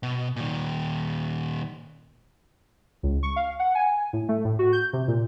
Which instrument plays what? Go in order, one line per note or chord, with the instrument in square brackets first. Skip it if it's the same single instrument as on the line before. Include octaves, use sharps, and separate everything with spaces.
[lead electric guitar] B2
A#2 D#3
[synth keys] C#2
C#6
F5
F#5
G#5
A2
A3
A2
F#4
G6
C3
A#2